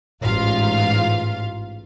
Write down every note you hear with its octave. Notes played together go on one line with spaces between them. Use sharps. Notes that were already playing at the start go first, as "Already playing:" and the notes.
A1 G#2 F4 F5